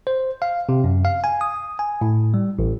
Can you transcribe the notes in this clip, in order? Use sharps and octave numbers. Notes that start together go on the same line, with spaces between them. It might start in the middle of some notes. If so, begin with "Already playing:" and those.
C5
F5
C3
F#2
F5
G#5
D#6
G#5
A2
G3
A1